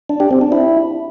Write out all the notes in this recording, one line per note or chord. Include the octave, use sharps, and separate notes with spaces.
D4
G4
C4
D4
E4